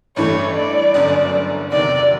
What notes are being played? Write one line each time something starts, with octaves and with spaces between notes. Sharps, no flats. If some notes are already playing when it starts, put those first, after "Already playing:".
A1 G2 E3 A3 C#5
D5
G1 F#2 D3 F#3
E2 C3 D#3 F#3 D5